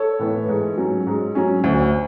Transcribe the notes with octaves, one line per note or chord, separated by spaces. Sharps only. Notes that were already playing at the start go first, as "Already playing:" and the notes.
Already playing: A4 C#5
A2 E3 B3
G#2
F#3 C#4
G#2
F#3 C#4
D2